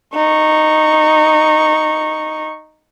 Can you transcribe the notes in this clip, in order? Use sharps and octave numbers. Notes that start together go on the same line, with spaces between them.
D#4 C#6